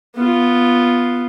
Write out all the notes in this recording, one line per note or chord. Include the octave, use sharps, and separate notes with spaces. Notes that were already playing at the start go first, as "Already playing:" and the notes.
B3 F4